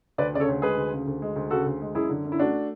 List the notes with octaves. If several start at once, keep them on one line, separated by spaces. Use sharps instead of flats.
D2 B4 D5
C#3 D5
A4 C#5
D2
G#3 G#4 B4
D2
C#3
D2
G#3
D2
C#3 F#4 A4
D2
G#3
F#2 E4 G#4
D3
F#2
E4
A3 D4 F#4